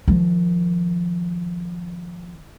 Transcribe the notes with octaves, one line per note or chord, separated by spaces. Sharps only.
D#3 F3